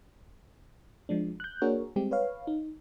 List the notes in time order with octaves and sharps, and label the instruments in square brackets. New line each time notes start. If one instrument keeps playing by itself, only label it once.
[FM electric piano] F3 G#3 D4
F#6 G6
A#3 D4 F#4 G#4 A#4 C#5
G3 G#3 C4 G4
B4 C#5 F5
D#4